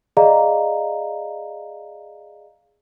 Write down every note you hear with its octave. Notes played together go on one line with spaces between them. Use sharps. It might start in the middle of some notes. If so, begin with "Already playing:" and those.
G#4 D5 D#5 F5 A#5